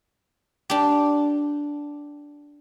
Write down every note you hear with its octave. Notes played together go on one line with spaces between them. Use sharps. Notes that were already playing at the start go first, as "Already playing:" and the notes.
D4 G4